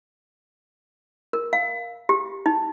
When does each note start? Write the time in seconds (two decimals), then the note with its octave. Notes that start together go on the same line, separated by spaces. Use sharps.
1.33 A#4
1.53 F5
2.09 G4
2.46 D#4